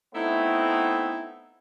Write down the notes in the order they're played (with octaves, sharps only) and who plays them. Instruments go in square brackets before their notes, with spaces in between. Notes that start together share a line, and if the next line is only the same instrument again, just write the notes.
[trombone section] A3 B3 C4 [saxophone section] D#4 E4